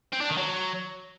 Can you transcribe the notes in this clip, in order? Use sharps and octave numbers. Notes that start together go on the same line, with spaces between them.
C4
D4
D#3
F#3